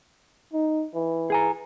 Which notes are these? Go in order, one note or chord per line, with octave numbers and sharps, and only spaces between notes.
D#4
E3
G#4 G#5 A#5